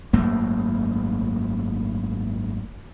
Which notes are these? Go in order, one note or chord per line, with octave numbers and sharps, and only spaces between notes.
G#1 F#2 A3 A#3